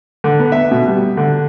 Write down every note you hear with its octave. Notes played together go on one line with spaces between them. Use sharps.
D3
B3
E5
B2
G3
D3